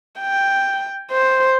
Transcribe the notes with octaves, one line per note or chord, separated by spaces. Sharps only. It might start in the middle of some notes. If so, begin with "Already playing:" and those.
G5
C5